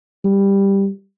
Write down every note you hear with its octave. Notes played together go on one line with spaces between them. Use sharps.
G3